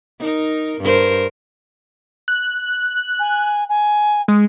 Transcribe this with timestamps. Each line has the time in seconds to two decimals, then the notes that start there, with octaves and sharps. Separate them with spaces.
0.20 D#4 A#4
0.81 G2 A#4 C5
2.28 F#6
3.19 G#5
3.69 G#5
4.28 G#3